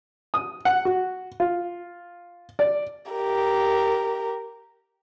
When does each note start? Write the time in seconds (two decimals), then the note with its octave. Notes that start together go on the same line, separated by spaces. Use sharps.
0.34 D#6
0.65 F#5
0.85 F#4
1.40 F4
2.59 D5
3.11 G4 A#4